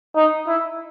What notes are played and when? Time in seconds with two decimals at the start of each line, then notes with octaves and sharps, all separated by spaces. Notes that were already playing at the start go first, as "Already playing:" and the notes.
0.15 D#4
0.47 E4